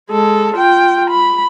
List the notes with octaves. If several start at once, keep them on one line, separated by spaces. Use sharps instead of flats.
G#3 A4
F4 G5
B5